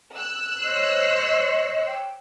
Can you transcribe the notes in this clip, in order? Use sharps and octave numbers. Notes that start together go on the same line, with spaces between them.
E6 F#6
C5 C#5 D#5
G5